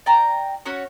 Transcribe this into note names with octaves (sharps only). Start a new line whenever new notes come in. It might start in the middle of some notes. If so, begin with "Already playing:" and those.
D5 G5 A#5
C#4 F#4 C#5